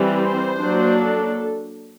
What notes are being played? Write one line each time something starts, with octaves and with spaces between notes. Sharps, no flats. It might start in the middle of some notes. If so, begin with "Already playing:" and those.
Already playing: E3 G3 C4
C5
F#3 A#3 D4
A4